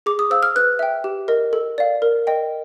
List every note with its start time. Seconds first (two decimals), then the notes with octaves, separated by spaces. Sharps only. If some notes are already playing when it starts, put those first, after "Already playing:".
0.06 G#4 D6
0.19 D#6
0.30 C5 F5 E6
0.43 F6
0.56 B4 F#6
0.79 E5 G5
1.04 G4
1.28 A#4 D#5
1.53 A4
1.78 D5 F5
2.02 A#4
2.27 D#5 G5